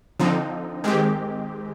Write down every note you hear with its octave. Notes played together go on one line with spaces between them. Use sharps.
D3 F3 C4 D#4
D#3 G#3 C4 G4